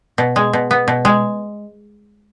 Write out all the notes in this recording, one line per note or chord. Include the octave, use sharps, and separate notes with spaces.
B2
G#3
B2
B3
B2
G#3